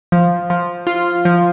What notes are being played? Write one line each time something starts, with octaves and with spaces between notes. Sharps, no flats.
F3
F3
F4
F3